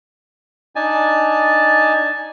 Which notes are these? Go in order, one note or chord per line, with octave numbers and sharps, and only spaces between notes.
D4 D#4 G#5 A5